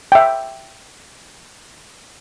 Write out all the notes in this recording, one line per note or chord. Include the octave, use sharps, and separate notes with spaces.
E5 G5